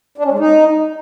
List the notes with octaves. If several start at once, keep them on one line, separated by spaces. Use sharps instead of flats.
D4
C#4
G#3
D#4